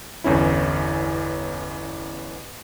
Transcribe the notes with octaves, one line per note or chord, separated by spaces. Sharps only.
G1 E2 C#4 E4